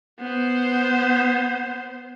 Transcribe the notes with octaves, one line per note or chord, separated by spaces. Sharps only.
B3 C5